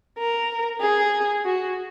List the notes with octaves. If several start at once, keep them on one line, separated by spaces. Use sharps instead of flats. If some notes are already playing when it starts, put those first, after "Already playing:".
A#4
G#4
F#4